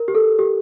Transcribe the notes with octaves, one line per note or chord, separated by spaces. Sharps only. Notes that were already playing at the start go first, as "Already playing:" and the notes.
Already playing: A#4
G4
A4
G4